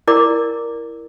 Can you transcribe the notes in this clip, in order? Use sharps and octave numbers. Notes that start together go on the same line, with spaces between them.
E4 A#4 D5 D6